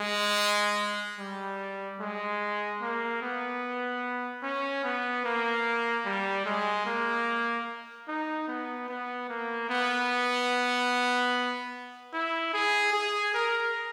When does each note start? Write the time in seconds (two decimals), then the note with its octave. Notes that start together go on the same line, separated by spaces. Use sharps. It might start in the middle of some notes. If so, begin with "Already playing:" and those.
Already playing: G#3
1.19 G3
2.00 G#3
2.81 A#3
3.22 B3
4.43 C#4
4.84 B3
5.25 A#3
6.05 G3
6.46 G#3
6.86 A#3
8.08 D#4
8.48 B3
8.89 B3
9.29 A#3
9.70 B3
12.14 E4
12.54 G#4
12.93 G#4
13.34 A#4